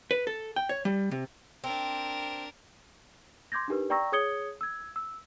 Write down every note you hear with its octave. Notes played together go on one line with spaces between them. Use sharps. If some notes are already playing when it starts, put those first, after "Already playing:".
B4
A4
G5
C#5
G3
C3
C4 D4 A#4
C6 D6 G6 G#6 A#6
D4 D#4 G4 A#4 B4
D5 G5 A#5 C#6 E6 A#6
G#4 C#5 D#6 G#6 C#7 G7
E6 G#6
E6